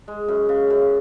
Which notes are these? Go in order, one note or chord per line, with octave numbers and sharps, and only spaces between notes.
G#3
F#2
C#3
F#2